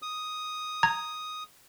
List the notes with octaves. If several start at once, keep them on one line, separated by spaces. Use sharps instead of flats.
D#6
A#5 G#6